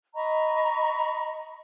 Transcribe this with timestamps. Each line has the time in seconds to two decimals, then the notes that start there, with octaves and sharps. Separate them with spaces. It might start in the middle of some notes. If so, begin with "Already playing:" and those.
0.15 D#5 A#5 B5 C#6